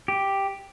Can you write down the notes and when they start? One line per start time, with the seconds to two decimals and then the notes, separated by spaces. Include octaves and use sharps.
0.08 G4